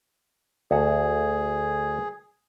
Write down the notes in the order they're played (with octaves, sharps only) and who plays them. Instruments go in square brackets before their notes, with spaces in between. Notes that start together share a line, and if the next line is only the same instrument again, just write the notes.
[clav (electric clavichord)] D2 F#4 [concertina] G#4